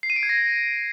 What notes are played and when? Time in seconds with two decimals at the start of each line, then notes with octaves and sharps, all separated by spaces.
0.03 C7
0.10 D#7
0.16 D7
0.23 G#6
0.29 A#6